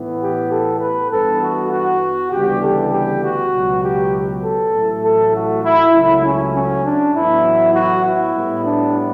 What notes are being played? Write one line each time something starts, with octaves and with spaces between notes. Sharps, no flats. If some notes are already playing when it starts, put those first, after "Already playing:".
Already playing: A2 E3 B3
G4
A4
B4
G2 E3 B3 A4
F#4
F#4
D2 C#3 E3 G3 B3 G4
A4
G4
F#4
C#2 B2 F#3 B3
G4
A4
A1 A2 F#3 A3
A4
F#4
E4
C#2 C#3 F#3 A3 E4
C#4
C#4
D4
A1 A2 F#3 B3 E4
F#4
E4
A2 G3 B3
D4